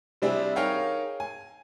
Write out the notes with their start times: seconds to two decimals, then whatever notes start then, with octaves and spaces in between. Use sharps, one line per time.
0.22 C3 G3 C4 D4 E4 G#4
0.56 D#4 G#4 A#4 C#5 F5 G5
1.20 G#5